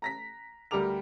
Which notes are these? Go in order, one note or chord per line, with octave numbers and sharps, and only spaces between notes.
A#5 A#6 B6
D2 G3 G4 A#4 D6 F7